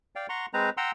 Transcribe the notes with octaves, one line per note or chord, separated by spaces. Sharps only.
D5 F5 G5
F#5 A#5 C6 C#6
G#3 C4 B4 C5 A#5
F#5 G5 A#5 C6 E6